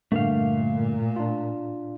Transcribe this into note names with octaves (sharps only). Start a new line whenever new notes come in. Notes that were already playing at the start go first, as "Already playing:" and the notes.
G2 A#2 D3 A3 A#3 F5
D4 F4